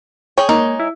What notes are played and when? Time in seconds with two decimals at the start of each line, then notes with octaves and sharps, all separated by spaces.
0.38 G#4 C#5 G5
0.49 G#3 A#3 D#4 C#5
0.80 E4